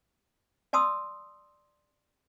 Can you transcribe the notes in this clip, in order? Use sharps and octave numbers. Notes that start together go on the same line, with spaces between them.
D5 A5 C6 D#6 E6